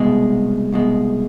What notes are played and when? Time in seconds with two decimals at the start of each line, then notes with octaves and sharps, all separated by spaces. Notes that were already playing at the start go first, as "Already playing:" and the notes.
Already playing: C2 B2 G#3
0.72 C2 B2 G#3